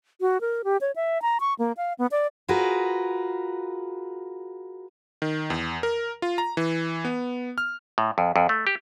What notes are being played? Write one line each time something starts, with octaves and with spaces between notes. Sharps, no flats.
F#4
A#4
G4
C#5
E5
A#5
C#6
A#3
F5
B3
D5
F4 F#4 G#4 A#4 B4
D#3
E2
A#4
F4
A#5
E3
B3
F6
A2
F2
F2
A3
G4